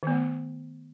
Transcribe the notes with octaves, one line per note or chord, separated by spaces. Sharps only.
D#3 A3 B3